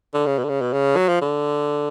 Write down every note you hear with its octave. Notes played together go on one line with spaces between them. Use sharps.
D3
C#3
B2
D3
C#3
B2
C#3
F#3
F3
D3